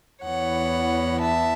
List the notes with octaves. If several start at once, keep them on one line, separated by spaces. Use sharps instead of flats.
E2 E3 B3 C#5 F#5
E5 A5